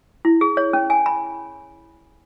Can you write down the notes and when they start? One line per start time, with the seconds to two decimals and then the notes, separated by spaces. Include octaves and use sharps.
0.25 E4
0.41 G#4
0.57 C#5
0.73 C#4
0.90 G#5
1.06 B5